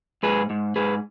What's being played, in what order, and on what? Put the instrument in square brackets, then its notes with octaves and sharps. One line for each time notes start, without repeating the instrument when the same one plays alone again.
[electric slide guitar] G#2 G#4 B4
G#2
G#2 G#4 B4